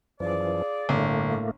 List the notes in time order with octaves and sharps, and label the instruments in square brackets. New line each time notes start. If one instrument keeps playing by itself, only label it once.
[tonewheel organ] F#2 E3 F3 [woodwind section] F4 G#4 D5
[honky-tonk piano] G1 [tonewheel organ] A2 A3 A#3